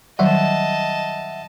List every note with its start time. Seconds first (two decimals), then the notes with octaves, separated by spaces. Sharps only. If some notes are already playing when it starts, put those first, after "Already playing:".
0.19 D#3 F#3 G3 D#5 E5 F#5 A5